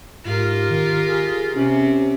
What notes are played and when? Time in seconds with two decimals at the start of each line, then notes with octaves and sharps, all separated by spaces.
0.25 G#2 F4 G4 A#4
0.70 D#3
1.08 G#4
1.56 C3 C#4